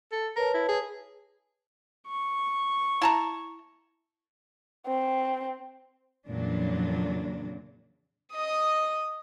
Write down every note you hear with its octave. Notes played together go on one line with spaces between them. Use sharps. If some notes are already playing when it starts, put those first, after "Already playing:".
A4
A#4 B4 C#5 A5
E4
G#4
C#6
E4 A5 A#5
C4
F2 A#2 C#3 E3 F#3 D4
D#5 D#6